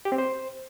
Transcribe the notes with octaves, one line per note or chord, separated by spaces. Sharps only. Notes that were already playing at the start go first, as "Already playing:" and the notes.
G4
C4
C5